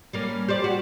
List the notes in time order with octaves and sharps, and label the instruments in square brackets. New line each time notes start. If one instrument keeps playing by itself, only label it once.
[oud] G3 A#3 C#4
G4 C5 D5
F#4 G4